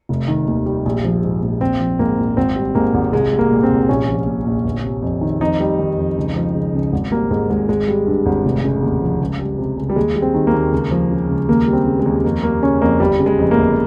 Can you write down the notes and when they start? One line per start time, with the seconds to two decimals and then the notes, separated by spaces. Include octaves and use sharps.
0.09 F1
0.28 D#3
0.48 D#2
0.66 G3
0.86 A#1
1.04 F3
1.23 G#2
1.42 A#1
1.61 A#1 C4
1.80 F3
1.99 G#2 A#3
2.18 A#1
2.37 G#1 C4
2.56 G3
2.75 G#2 A#3
2.94 G#1
3.13 C2 G#3
3.32 G3
3.39 A#3
3.51 A#2
3.63 C4
3.70 C2
3.89 A#1 C#4
4.08 F3
4.26 A#2
4.46 A#1
4.65 G1
4.84 C3
5.02 F2
5.21 D#3
5.41 F2 D#4
5.60 G3
5.79 D#3
5.98 F2
6.17 C#2
6.36 F3
6.55 C#3
6.74 C#2
6.93 G#1
7.11 G3 A#3
7.31 G#2 G#3
7.50 G#1 G#3
7.69 G#1 G#3
7.88 G3
8.07 G2
8.26 G#1
8.45 F1
8.64 C#3
8.83 D#2
9.02 F3
9.20 C#2
9.39 G3
9.59 C3
9.77 C#2
9.90 G3
9.96 D#2 G#3
10.16 G3
10.22 C4
10.34 D#3
10.47 A#3
10.54 D#2
10.72 C#2
10.91 F3
11.11 C#3
11.29 C#2
11.49 D#2 A#3
11.67 G3
11.73 C4
11.86 C#3
11.99 G#3
12.06 D#2
12.24 F2 A#3
12.43 G3 A#3
12.62 C#3 C#4
12.81 F2 A#3
13.00 G1 G3
13.19 C#3
13.26 G#3
13.39 F2
13.51 A#3
13.58 G1